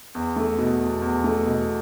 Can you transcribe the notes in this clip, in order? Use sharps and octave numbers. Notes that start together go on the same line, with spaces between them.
E2
A3
B2
E2
E2
A3
B2